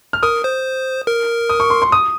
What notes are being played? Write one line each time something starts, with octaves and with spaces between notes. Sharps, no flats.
F6
A#4 D#6
C5
A#4
D#6
C#6
C6
C6
D#6